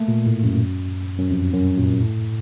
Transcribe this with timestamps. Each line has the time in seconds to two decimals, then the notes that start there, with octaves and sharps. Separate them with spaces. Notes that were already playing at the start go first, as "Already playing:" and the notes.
Already playing: A3 A#3
0.08 A#2
0.26 A2
0.44 F#2
1.18 F#2
1.30 F2
1.53 F#2
1.77 A#2
2.00 A2